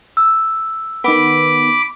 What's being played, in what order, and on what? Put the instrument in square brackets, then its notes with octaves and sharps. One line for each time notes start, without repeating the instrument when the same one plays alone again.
[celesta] E6
[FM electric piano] D#3 B3 [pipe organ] B5 D6